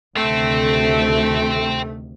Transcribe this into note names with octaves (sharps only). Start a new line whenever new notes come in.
D2 C3 D#3 A3 C4